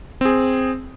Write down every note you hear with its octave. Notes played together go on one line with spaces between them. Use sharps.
C4 G#4